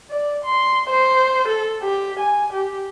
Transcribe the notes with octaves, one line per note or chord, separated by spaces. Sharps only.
D5
C6
C5
A4
G4
G#5
G4